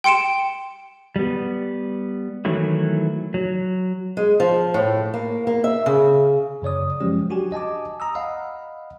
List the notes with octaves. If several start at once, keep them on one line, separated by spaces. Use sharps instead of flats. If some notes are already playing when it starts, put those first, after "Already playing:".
G5 C6 C#7 D7 E7
G3 B3
D#3 E3 F#3 A3 E4
F#3
G#3
F3
A2
A#3
A#3
E5
C#3
F#2 C#3 C#5 D5 D#6
F3 F#3 G#3 C#4 G4
D4 F#4 G4 G#5
D#5 G#5 A5 D6
A#5 D#6 E6
D#5 F5 F#5 B5